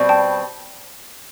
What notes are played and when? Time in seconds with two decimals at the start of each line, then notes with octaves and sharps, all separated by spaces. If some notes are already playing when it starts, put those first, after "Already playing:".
Already playing: B2 G3 C4
0.09 G5 A5